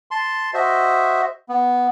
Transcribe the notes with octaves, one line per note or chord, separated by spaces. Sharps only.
A5 C6
F#4 C5 D#5 E5
B3